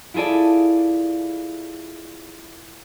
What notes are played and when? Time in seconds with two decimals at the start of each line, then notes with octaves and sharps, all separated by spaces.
0.14 E4 F4 G#4 A4 D5